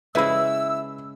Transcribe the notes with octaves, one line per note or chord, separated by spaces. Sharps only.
C#3 G#3 E4 B4 E5 B5 E6